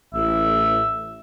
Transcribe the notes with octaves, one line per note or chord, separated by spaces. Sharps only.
A1 E5